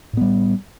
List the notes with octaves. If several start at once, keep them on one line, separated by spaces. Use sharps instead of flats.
A2 G3 B3